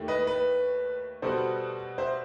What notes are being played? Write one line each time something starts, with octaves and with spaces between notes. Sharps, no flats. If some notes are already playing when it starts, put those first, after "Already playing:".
Already playing: D#2 D#3 A3 E4 G4
B4 D#5
B4
B2 G3 B3 F#4 A4 C5
C5 E5